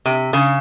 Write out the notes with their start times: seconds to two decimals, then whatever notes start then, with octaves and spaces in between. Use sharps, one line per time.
0.06 C3
0.33 C#3